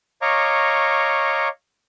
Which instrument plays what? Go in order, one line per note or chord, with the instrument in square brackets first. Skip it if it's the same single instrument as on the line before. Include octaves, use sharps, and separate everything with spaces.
[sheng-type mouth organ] C#5 D#5 F5 A#5 C#6 D6